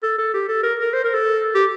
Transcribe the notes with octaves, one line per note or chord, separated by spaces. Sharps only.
A4
A4
G4
A4
A#4
A#4
C5
A#4
A4
G4